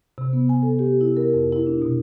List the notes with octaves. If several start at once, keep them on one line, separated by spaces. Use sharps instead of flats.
C3
B3
G#5
A4
G4
E4
A#4
F2
E4
D4
B2